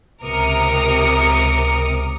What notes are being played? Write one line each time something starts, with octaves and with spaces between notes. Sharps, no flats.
C#2 C3 A#4 D6 D#6 C#7